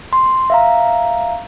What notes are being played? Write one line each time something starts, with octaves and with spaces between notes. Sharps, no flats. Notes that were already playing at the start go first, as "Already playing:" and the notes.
C6
E5 F5 A#5